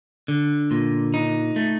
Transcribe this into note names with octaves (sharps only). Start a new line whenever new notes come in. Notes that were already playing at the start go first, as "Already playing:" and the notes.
D3
A#2
D#4
A3